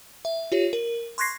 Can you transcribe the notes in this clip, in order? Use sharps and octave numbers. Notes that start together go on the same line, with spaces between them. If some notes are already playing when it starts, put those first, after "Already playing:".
E5
F4 G4 C#5
A#4
C6 C#6 F#6 G#6 A#6 C7